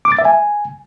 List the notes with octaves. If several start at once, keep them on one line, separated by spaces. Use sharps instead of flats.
D6
A6
E5
G#5